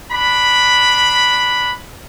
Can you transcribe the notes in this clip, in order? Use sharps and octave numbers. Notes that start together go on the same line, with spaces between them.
D4 B5